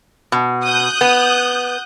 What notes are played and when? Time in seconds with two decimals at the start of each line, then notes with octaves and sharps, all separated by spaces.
0.32 B2
0.63 D#6 F#6 G6
1.01 B3